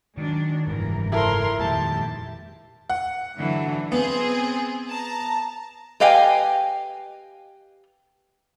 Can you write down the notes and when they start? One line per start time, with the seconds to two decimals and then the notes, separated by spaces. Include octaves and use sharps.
0.18 D#3 F#3 G#3 D4
0.67 F#1 G#2 E3 G3 A#4
1.12 F3 E4 A4 A#4 C5 C6
1.60 F2 A#2 D#3 G#3 G4 E5 A5
2.90 F#5
3.38 D3 E3 F#3
3.92 B3 C4 G#4
4.89 A5 A#5
6.00 G4 B4 D#5 F5 G5 G#5